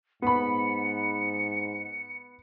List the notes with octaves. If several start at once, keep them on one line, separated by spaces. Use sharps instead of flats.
G#2 B3 B5 C#7